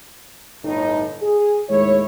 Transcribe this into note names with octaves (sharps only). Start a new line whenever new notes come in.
G1 A2 D#4
G#4
D#2 A2 G#3 E4 C#5